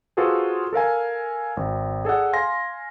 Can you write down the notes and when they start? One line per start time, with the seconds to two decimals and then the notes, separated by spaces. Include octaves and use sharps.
0.17 F4 F#4 G#4 A4 B4 C5
0.73 A4 A#4 F5 G#5
1.57 G#1
2.05 G#4 A4 D5 F#5
2.33 F5 G#5 C6 A#6